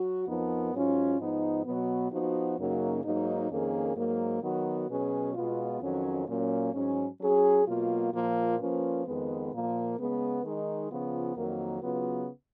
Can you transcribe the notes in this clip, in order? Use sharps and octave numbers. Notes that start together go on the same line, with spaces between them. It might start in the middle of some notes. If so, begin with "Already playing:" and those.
Already playing: F#3 F#4
F2 F3 B3 D#4 A#4
G#2 F#3 C#4 F4
G#2 F3 B3 D#4
B2 F#3 B3
F3 B3 D#4 F#4
F#2 C#3 F#3 A#3 D#4
G#2 F#3 A#3 D#4
F2 D#3 A#3 C#4 G#4
G#2 F#3 A#3
D#3 F#3 B3 F#4
B2 F#3 C#4 G#4 B4
B2 G#3 B3 F4
F2 D#3 F#3 C#4
A#2 F#3 A#3 C#4
G#2 F#3 C#4
F#3 C#4 G#4
B2 F#3 A#3 F4
A#2 F3 A#3 F4
F3 A#3 C#4 F4 B4
F2 D#3 G#3 B3
A#2 F3 A#3
C#3 G#3 B3
D#3 G#3 D#4
C#3 F3 B3 F4
F2 D#3 F#3 A#3
C#3 F#3 B3 F4 B4